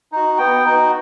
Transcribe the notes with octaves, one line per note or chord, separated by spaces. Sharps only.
D#4 F#4
B3 G5
D#4 F#4